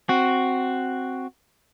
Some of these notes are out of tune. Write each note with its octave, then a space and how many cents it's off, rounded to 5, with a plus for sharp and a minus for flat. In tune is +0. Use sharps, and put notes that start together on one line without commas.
C4 +0 F#4 +0